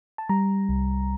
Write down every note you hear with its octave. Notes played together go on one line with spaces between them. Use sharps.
A5
G3 A#5
C2